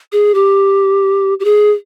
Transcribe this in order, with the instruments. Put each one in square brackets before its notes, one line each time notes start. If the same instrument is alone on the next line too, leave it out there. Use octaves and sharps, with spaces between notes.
[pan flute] G#4
G4
G4
G#4